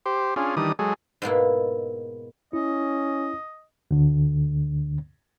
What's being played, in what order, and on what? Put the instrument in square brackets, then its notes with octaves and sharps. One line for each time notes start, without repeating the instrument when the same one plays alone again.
[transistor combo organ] G4 C5
C#4 D4 F4 G#4
D#3 E3 G3 D4 D#6
F#3 G#3 G#4 A4
[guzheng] G#2 B2 A#3 E4
[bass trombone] C#4 [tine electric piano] E4 [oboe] D#5
[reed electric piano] D2 D3